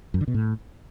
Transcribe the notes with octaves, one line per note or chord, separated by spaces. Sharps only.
F#2
D3
B2
A2